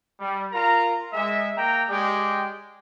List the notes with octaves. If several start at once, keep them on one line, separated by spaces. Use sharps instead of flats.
G3
F4 A#4 A#5
G#3 E5
A#3 G5 A#5
G#3 G4 D5 G5